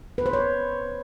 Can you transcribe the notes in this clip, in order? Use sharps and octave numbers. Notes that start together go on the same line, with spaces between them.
B4
C5
C#5